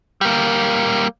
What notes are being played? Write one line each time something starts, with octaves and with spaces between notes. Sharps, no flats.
G3 A#3